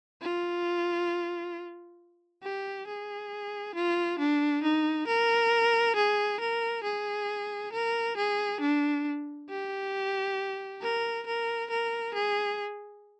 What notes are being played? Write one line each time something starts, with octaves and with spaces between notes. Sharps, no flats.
F4
G4
G#4
F4
D4
D#4
A#4
G#4
A#4
G#4
A#4
G#4
D4
G4
A#4
A#4
A#4
G#4